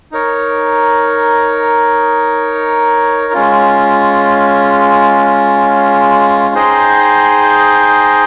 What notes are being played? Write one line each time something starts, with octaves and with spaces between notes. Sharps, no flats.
D#4 A#4 C#5
G#3 C#4 F4
D#4 G#4 C5 D#5 G5